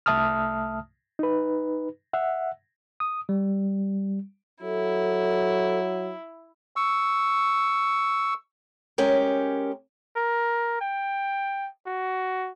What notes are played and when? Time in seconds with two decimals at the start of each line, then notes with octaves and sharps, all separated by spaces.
0.06 C2 A3 E5 A5 D#6 F6
1.19 D#4 B4
2.13 E5 F#5
3.00 D#6
3.29 G3
4.62 F#3 E4 A4
6.76 C#6 E6
8.98 G#3 C#4 G4 A#4
10.16 A#4
10.81 G5
11.87 F#4